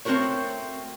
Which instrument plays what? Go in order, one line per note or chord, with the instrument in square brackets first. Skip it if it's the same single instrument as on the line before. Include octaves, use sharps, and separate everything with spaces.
[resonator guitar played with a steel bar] A3 C4 E4 F#4 A#4 C#5